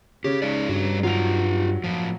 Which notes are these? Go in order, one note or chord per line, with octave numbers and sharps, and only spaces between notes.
C#3 G4 C#5
G#3 D#4 D5
G2 G3 F#4
F#3 F4 G4 F7
A2 F3